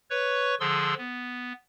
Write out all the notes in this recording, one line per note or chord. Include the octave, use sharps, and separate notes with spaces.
B4 C#5 C#6
D3 F3 G#4 C6 E6
B3